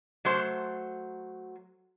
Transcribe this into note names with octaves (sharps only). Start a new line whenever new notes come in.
F#3 A3 C5